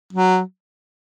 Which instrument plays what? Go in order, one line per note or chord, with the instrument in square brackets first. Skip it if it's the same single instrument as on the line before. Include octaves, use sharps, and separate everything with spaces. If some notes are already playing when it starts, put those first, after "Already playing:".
[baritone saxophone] F#3